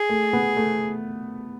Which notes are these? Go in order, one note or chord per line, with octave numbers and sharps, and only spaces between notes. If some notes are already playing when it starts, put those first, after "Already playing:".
Already playing: G#4
A3
B3
A3